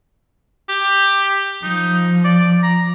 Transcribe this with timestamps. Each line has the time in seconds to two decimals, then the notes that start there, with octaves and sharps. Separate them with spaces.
0.69 G4
1.63 F3 D#4
2.24 D5
2.63 A#5